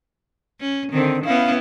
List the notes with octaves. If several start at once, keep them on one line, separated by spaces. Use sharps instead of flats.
C#4
D3 D#3 C4
B3 C#4 E4 F5